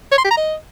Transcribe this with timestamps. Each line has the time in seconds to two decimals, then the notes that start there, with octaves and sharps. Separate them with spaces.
0.12 C#5
0.18 C6
0.24 G4
0.31 A#5
0.37 D#5